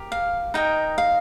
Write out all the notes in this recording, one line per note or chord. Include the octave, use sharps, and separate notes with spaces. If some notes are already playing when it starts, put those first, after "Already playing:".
Already playing: G4 A#4
F5
D#4 A#4 D#5 G5
F5